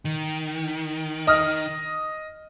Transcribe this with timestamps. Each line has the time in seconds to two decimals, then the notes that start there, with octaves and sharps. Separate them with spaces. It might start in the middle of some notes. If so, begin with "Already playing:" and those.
0.05 D#3
1.27 D#5 D#6 F6